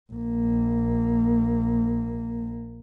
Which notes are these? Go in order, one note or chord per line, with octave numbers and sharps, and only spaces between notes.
A#1 A#3